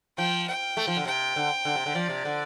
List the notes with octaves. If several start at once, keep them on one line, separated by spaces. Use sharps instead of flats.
F3 G5
G5
A3
F3
D3
C3 G5
D3
D3
C3
D3
F3 D5
C3
D3